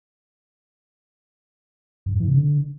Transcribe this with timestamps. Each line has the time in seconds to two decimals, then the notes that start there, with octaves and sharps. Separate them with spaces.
2.06 F#2
2.13 G2
2.20 E3
2.27 C3
2.34 D3